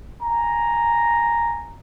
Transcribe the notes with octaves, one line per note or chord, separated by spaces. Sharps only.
G#5 A#5